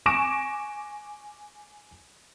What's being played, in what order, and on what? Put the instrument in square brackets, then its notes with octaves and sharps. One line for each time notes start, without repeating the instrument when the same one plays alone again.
[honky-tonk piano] G#5 C#6 D6 A#6 D7 E7